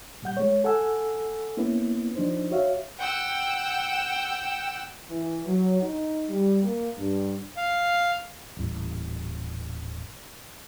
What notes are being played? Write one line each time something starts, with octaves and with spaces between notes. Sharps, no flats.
A#2 G3 F#5 G6
G#3 C#5
A4 F#5 G#5 E6
A#3 B3 C#4 E4 B4
F3 D4 D#4 C5
F#4 C#5 E5 F5
F#5 G5 E6
E3
F#3
D#4
G3
A#3
G2
F5
D#1 A1